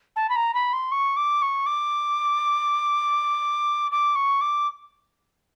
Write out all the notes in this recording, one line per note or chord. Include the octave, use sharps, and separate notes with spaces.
A5
B5
A#5
B5
C6
C#6
D6
C#6
D6
D6
C#6
D6